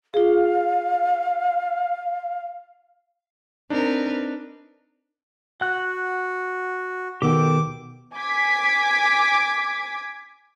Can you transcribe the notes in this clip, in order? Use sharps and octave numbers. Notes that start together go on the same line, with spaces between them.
F4 G#4 F5
C4 D4 D#4 A#4 B4
F#4 F#5 F#6
B2 D#3 B3 G4 A4 G5 D6
G#5 D6 G#6 B6